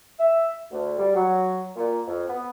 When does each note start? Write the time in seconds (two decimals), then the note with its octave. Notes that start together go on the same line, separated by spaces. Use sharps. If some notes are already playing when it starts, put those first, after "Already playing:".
0.19 E5
0.71 D2
0.98 G3
1.14 F#3
1.76 A#2
2.07 F2
2.28 B3